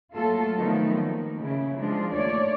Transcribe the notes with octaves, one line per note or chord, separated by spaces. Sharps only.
F#3 A3 A#3 F4 A4
D#3 F3 F#3 A3 B3 D#4
A#3
C#3 E4
F3 G#3 D4 F4
D#2 A3 C#5 D5